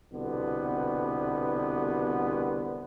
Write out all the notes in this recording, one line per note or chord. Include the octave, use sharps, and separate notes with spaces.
C2 B2 D3 B3